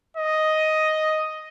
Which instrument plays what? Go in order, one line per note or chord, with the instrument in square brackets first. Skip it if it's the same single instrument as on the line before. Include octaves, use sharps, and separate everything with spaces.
[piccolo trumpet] D#5